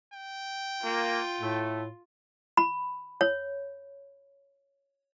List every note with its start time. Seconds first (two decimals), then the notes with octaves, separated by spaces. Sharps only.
0.13 G5
0.84 A#3 F4
1.40 A2 A3
2.57 B5
3.21 C#5